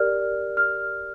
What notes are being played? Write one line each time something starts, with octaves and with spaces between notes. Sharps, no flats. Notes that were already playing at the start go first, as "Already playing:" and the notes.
Already playing: G4 A#4 D5 F6
F6